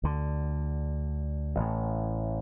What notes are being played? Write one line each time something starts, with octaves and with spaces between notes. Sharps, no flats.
D2 D3
A1 A2